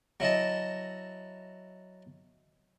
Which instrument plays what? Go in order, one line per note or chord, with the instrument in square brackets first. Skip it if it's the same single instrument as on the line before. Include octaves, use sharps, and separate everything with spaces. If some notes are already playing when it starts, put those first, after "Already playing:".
[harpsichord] F#3 E4 D#5 A5